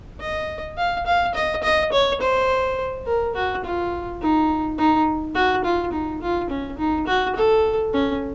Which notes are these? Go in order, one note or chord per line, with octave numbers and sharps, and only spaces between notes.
D#5
F5
F5
D#5
D#5
C#5
C5
A#4
F#4
F4
D#4
D#4
F#4
F4
D#4
F4
C#4
D#4
F#4
A4
C#4